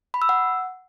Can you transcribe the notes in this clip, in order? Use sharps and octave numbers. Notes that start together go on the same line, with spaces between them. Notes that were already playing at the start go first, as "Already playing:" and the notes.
B5
E6
F#5